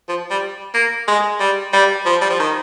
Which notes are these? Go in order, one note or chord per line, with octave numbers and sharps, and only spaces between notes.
F3
G3
A#3
G#3
G3
G3
F3
G3
F3
D#3